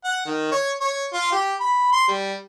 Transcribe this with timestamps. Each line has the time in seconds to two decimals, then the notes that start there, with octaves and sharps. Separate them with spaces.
0.04 F#5
0.26 D#3
0.52 C#5
0.81 C#5
1.13 F4
1.32 G4
1.60 B5
1.92 C6
2.08 G3